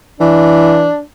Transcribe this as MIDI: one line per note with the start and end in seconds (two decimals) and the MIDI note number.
0.20 0.89 52
0.20 1.01 62